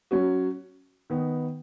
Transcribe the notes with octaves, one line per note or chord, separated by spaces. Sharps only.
F#3 C#4 F#4
D#3 B3 D#4